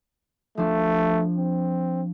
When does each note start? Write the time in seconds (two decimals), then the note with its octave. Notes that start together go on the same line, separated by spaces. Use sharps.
0.57 F3 A3 D4
1.37 C4